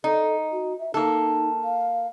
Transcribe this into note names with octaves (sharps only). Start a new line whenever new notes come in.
D#4 A4
F#4
E5
A#3 D#4 A4
F5